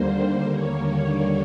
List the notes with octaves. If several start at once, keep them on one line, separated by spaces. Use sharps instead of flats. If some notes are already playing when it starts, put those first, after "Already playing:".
Already playing: D#2 D3 G3 A#3 C5
C#5